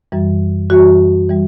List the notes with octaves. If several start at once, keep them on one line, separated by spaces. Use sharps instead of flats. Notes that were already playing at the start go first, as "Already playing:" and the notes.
F#2 E3 G3
F#2 E3 G3 F#4
E3 G3